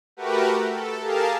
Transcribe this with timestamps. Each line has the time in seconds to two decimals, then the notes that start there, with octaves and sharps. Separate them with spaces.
0.17 A3 F#4 G4 A#4 B4
0.68 A4
1.02 G4 G#4 A#4 F5 A5